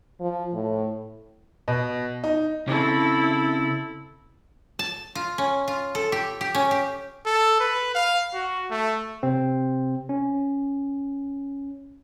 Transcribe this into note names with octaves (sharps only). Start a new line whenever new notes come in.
F3
A2
B2
D#4
C#3 C4 E4 A4
A5
F4
C#4
F4
A4
G4
G4
C#4
G4
A4
B4
F5
F#4
A3
C3 C4
C#4